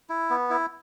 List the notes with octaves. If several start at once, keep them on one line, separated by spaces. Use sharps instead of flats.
E4
B3
E4